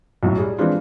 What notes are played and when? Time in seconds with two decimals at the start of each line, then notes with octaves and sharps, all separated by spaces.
0.23 B1 F#2 A2
0.38 G3 G#4
0.58 E3 F3 G#3 C4 D4 F4